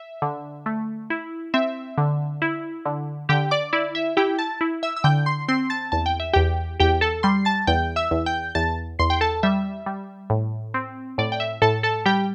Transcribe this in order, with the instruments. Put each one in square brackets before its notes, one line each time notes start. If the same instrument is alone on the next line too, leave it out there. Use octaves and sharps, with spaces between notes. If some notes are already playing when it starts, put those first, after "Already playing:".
Already playing: [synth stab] E5
D3
A3
E4
C4 E5
D3
E4
D3
D3 G4 G5
D5 D6
E4 D5
E5
E4 G4 G5
A5 A6
E4
E5 E6
E6
D3 G5 G6
C6 C7
C4 C6 C7
A5 A6
E2 A5
G5
E5
E2 G4 G5
E2 G4 G5
A4 A5
G3 C6 C7
A5 A6
E2 G5 G6
E5 E6
E2
G5 G6
E2 A5 A6
E2 C6 C7
G5
A4 A5
G3 E5
G3
A2
C4
A2 D5
G5
E5
A2 A4 A5
A4 A5
G3 G4 G5